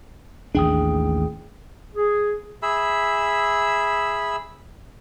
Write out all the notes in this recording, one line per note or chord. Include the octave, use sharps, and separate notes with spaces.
A1 D#2 D4 G#4 G5 D#6
G#4
G#4 E5 B5 E6